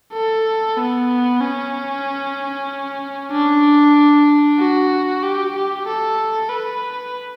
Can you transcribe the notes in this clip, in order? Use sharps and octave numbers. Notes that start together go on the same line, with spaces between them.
A4
B3
C#4
D4
F#4
G4
G4
A4
B4